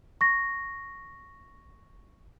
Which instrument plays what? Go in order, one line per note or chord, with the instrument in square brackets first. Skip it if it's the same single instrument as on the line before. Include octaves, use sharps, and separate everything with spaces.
[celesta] C#6 A#6